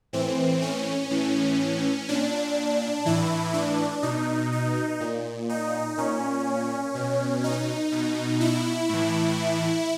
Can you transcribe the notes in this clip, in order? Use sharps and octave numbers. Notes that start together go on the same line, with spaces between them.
A2 E3 C4
C#4
A2 E3
A#2 D4
A2 E3 E4
D4
B2 D#4
D#4
A#2
D#4
A#2 C#4
B2
D#4
B2
E4
A2 E3